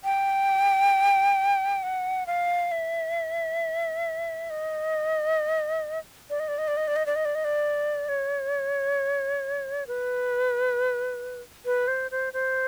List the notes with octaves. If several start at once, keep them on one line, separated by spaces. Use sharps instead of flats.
G5
F#5
F5
E5
D#5
D5
D#5
D5
D#5
D5
D#5
D5
D#5
D5
D#5
D5
D#5
D5
C#5
B4
B4
C5
C5
C5